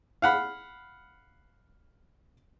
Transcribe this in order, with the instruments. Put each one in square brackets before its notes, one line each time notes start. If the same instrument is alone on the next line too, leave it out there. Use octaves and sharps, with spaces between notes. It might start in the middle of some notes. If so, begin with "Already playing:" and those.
[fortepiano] F5 F#5 B5